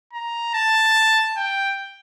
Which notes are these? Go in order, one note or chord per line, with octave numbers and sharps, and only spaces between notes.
A#5
A5
G5